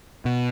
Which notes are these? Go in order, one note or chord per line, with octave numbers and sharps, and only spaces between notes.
B2